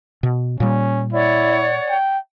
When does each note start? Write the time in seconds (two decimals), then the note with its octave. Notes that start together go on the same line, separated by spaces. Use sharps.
0.23 B2
0.60 A#2 G3 C#4
1.13 E4 C#5 D5 F#5
1.89 G5